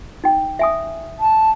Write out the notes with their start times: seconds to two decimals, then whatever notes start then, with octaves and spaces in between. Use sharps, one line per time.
0.24 D#4 G5
0.59 E5 G#5 D#6
1.20 A5